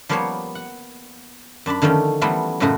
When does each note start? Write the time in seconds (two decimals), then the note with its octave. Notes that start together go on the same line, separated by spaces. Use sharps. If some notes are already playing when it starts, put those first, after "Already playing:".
0.09 F3 G3 A#3 B3 C5 C#5
0.55 F#5
1.66 F#2 D4 A5 B5
1.82 D3 D#3 F3 A3 C#4
2.21 E3 F#3 G3 A3 B3 F4
2.60 F#2 A2 C#3 A3 D#4 F#4